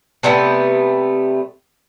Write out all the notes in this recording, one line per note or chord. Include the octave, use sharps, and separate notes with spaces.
C3 G3 A3 B3